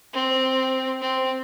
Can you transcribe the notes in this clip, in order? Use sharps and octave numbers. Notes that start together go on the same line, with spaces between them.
C4
C4